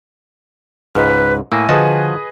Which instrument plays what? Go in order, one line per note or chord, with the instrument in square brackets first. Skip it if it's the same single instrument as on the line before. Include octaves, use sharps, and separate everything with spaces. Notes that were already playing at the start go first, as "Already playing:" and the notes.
[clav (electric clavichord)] C#2 G#2 [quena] B4 [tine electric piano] D#5 F6
[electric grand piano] A2 [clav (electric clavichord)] A#3 [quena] G#5 [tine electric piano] E6 A#6
[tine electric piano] D3 [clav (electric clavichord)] F3 F#4 A5 [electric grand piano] G#4 B4 D#5